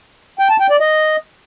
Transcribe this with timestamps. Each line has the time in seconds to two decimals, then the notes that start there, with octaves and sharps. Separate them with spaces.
0.39 G5
0.49 A5
0.60 G5
0.70 D5
0.80 D#5